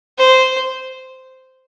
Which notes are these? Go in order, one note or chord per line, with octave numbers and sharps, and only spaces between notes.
C5